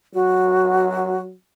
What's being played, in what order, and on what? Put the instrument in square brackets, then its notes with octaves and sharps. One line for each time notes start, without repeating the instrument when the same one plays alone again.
[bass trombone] F#3 [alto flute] F#4